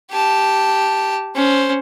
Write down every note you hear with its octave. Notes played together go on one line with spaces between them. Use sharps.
G4 A5
C#4 C5